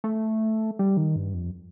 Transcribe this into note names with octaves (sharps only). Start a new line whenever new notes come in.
A3
G3
D#3
G2
F2